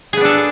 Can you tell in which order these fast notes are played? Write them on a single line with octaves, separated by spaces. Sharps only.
G#4 B3 D4 A4